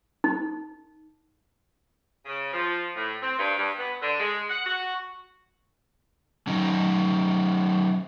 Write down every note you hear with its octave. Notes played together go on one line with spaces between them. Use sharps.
D#4
C#3
F3
A2
C4
G2
G2
B3
D3
G#3
F#5
F#4
F#3 C#4 D#4